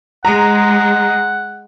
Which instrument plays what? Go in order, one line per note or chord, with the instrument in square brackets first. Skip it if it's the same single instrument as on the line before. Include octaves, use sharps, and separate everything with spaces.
[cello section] G#3 [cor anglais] F#5 [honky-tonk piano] A#5